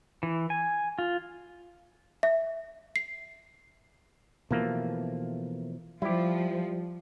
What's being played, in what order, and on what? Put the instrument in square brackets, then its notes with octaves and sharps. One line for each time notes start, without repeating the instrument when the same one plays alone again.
[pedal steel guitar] E3
G#5
F4
[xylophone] E5
C7
[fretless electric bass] B2 E3 F3 [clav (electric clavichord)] A3 A#3
[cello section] F3 [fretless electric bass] G3 [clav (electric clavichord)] E4 G4